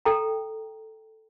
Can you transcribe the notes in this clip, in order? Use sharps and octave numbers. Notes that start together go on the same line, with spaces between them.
A4 G5 A#5